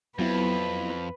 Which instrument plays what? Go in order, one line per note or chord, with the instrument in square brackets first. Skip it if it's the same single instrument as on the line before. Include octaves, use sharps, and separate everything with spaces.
[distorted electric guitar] F2 [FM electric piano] F#3 B3 E4 [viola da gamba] B4